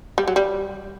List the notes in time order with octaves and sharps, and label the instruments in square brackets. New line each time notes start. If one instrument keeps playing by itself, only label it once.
[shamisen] G3
F#3
G3